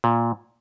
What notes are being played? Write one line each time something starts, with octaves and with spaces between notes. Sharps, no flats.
A#2